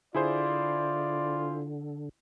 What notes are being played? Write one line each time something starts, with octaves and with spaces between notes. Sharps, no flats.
D3 E4 F4 G#4 C5 D5